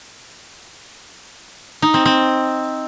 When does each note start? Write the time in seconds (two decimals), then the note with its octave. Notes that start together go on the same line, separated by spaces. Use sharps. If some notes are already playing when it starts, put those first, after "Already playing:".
1.82 D#4
1.94 C4
2.05 C4